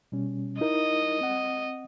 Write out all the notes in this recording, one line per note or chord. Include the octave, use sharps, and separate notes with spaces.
B2 G3 C#4
D#4 E4 A#4 D#5
C4 F#5